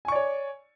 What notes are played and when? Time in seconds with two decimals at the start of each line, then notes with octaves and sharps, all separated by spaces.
0.05 G#5
0.08 C#6
0.12 D5
0.15 C#5